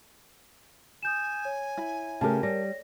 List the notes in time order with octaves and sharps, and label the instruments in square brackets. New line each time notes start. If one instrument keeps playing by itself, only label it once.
[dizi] G#5 [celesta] D#6 G6 E7
[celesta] C#5
[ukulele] E4
[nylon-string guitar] C#3 A3 G4 [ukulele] A#4 A5
[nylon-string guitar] G3 [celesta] C#5 A#6